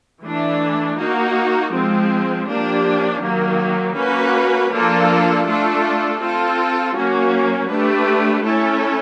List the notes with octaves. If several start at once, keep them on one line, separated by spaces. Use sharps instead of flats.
E3 A3 D4
A#3 D#4 F#4
F3 G#3 C4
F3 A#3 D4 G4
D#3 F#3 A#3
A#3 C#4 F#4 B4
F3 A#3 D4 F4 A4
A3 D4 F4 A4
C4 F4 A4
F#3 A#3 C#4 F#4
A3 D4 G4 B4
A3 C#4 E4 A4